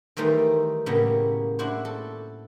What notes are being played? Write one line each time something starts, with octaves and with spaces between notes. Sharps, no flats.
D#3 E3 G3 A3 D#4 C5
A2 C#3 G3 A#3 B3
D4 E4 F#4 C5
A4